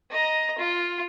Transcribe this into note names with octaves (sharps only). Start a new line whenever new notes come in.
D#5 A#5
F4